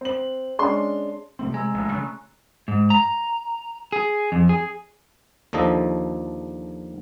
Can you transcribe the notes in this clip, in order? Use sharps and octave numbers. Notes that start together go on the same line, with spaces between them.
C4 F#7
G#3 C#4 D4 C6
C3 A3 C4 C6
C3 G#3 G#5 A#5 E6
A1
C#3 A3 C#6 F#6
G#2
A#5
G#4
F2
G#4
D#2 D3 F3 A4 D#5